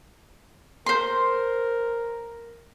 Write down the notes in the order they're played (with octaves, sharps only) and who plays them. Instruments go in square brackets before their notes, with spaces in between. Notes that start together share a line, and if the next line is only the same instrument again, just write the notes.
[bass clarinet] A#4 [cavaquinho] C5 C6